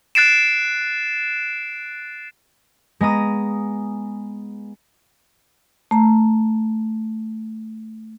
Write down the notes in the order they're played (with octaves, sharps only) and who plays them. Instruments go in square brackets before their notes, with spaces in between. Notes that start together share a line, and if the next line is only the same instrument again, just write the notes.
[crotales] F#6 A6 C7 D7 E7
[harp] G#3 B3 A#5 D#6
[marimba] A3 A#5